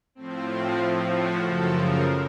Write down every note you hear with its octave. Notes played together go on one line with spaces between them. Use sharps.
A2 F3 C4
C4
A2 F3
F#4
F#2 C#3 F3 A4
A#4